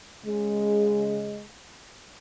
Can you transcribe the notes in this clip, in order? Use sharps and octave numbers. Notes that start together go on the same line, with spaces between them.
C#3 G#3